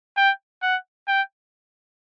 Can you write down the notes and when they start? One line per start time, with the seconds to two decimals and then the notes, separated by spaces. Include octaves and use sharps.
0.17 G5
0.63 F#5
1.08 G5